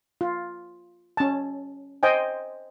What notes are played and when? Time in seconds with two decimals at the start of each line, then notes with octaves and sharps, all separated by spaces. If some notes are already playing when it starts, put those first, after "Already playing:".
0.21 F4
1.17 C#4 A5
2.03 C5 D#5 G5 G#5